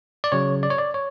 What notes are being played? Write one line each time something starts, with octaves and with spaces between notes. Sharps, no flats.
D5
C#3 F#3 C#5
D5
C#5
D5
C#5